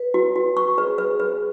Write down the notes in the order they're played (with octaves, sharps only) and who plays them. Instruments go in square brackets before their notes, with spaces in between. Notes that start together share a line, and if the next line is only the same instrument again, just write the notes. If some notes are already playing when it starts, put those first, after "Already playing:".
Already playing: [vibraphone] B4
[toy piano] F#4
F#4
C#6
[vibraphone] G#4 [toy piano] B4
[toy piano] B4
B4